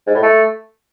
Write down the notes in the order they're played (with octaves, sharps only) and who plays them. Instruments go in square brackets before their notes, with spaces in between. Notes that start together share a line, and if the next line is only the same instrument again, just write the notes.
[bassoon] G#2
A2
A3